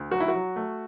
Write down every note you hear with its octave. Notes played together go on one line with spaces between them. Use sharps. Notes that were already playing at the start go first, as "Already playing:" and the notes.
Already playing: D2
F#3 F#4
E4
F#4
F#3
A3